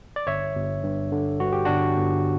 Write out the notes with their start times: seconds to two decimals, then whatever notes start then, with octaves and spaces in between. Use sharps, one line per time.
0.16 D5
0.27 G1 C#5 E5
0.55 G1
0.83 G2
1.12 D3
1.40 G2 F#4
1.53 G4
1.65 G1 D4 F#4
1.96 G1